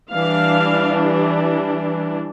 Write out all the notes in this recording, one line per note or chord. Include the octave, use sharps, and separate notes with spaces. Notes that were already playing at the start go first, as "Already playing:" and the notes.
E3 G3 D4 F5